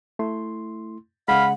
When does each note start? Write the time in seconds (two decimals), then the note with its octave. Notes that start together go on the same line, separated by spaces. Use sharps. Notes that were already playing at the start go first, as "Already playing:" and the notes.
0.19 A3 E4 C6
1.28 C#3 G#3 F5 F#5 B5